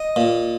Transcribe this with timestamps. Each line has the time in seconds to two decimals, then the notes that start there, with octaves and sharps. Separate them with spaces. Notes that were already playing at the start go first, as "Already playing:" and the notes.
Already playing: D#5
0.16 A#2